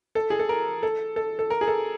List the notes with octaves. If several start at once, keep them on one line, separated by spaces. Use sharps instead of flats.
A4
G#4
A4
A#4
A4
A4
A4
A#4
G#4
A4